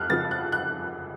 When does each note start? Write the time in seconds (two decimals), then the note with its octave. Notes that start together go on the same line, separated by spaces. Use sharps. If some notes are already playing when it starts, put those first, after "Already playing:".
Already playing: F2 F6 F#6
0.10 C#3 F3 A6
0.31 F#6
0.52 F#6